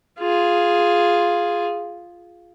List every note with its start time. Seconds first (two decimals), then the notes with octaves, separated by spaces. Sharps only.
0.19 F4 G#4